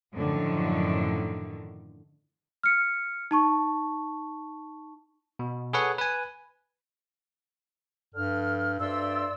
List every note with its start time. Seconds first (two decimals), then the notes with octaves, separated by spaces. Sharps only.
0.14 F#2 A2 D3 D#3 F3 F#3
2.63 F6 C#7
3.31 D#4 A5 C#6
5.39 B2
5.73 G#4 A4 B4 C#5 F#5
5.98 B4 G#5
8.14 G2 D3 F3 F6
8.79 D2 G2 D5 E5 C6 E6